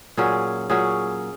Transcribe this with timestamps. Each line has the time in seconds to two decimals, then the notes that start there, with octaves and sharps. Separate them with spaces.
0.17 A#2 F#3 C#4 G#4
0.70 A#2 F#3 C#4 G#4